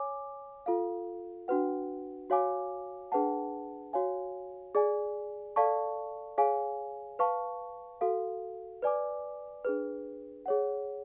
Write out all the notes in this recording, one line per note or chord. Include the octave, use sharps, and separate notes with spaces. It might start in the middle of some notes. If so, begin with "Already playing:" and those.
Already playing: C#5 G#5 D6
F4 A4 F5
D4 F#4 B4 F#5
F#4 C#5 F5 G#5 D6
D4 G#4 B4 F#5 A5
F#4 C#5 F5 G#5
G#4 D5 G#5
A4 D5 F5 A5 C#6
G#4 C#5 F5 G#5
B4 F5 A5 C#6
F#4 A4 F5
B4 D5 G#5 D6
D4 G#4 B4
G#4 C#5 F#5